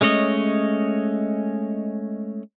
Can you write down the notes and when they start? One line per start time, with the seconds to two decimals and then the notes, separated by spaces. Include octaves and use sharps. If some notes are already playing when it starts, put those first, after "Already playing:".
0.01 G#3 A3 C#4 C#5 D#5